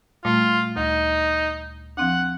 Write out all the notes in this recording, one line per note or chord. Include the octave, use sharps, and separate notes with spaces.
A#2 G3 A3 F4
D2 D#4
F3 C4 D4 F#5